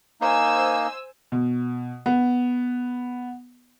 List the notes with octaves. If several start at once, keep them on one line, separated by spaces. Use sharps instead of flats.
A#3 D#4 C5 G#5 E6
B2
B3